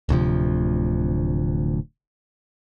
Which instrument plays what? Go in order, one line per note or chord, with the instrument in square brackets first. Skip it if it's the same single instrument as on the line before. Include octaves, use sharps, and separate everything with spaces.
[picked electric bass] D1 D2 C3 F3